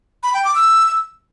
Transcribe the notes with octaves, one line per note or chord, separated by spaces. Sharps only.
B5
G5
D6
E6